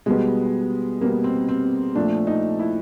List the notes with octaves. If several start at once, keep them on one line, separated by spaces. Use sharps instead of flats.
B2 G3 G#3 B3
B2 G3 A#3 B3
C4
C4
A#2 F3 A3 D4
D#4
E4